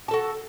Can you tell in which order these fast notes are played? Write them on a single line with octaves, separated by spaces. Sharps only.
A5 A4 F#4